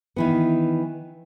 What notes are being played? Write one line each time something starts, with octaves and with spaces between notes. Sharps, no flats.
D#3 E3 B3